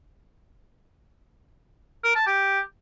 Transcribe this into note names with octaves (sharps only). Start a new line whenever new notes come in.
A#4
A5
G4